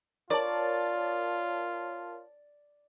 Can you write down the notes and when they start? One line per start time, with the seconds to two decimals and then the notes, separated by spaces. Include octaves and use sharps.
0.30 F4 A#4 C#5 D5 A5